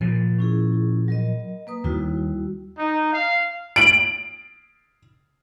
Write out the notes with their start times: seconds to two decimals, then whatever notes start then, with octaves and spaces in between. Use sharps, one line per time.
0.01 A#2 F3 A#4
0.39 C#4 E4 G#4
1.08 F#3 A#4 D#5
1.67 A#3 B4 D#6
1.84 D#2 G3 E4 F#4
2.78 D#4
3.13 F5
3.76 D7 F#7